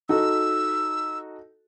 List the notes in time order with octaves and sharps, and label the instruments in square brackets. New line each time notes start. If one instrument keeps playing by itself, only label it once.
[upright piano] D#4 F#4 A4 [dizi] E6